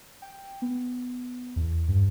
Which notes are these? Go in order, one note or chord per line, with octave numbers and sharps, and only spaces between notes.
G5
B3
E2
G2